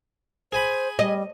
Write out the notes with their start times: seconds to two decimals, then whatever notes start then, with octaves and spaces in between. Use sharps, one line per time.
0.52 G#4 C5 G#5 B5
0.99 G3 D#5